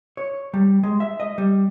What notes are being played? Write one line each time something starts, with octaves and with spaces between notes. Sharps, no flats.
C#5
G3
G#3
E5
D#5
G3